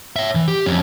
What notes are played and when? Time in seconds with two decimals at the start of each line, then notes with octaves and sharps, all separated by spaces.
0.16 C#5 E5
0.35 E3
0.48 G4
0.66 F2 C#4